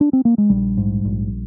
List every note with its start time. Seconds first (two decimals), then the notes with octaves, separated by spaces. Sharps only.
0.01 D4
0.13 C4
0.25 A#3
0.38 G#3
0.50 A#1 G3
0.77 G#2
1.05 A#1